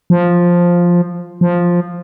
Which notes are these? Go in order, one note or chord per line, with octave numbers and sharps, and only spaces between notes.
F3
F3